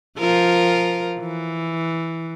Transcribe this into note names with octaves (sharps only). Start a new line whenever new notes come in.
F3 F4 A#4
E3